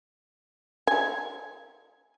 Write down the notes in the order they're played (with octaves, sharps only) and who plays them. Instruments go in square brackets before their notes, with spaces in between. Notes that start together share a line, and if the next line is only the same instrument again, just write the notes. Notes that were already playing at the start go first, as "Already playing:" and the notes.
[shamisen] G#5